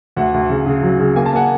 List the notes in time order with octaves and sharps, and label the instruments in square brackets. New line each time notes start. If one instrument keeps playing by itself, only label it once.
[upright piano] D2 [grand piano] E5 F#5
[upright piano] D2
C#3
C#3
F#3
C#3
[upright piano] A#3 [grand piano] G#5
[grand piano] A5
[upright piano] A#3 [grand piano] F#5 G#5